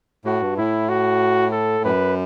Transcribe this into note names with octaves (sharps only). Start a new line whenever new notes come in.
A2 F#4
G2
A2 E4
F#4
A4
F#2 B4